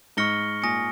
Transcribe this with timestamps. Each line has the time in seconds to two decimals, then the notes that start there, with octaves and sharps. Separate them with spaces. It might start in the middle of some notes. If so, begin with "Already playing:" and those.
0.17 G#2 C#6 F6 A#6 C#7 G7
0.62 A#2 G#5 D#6 A#6 C#7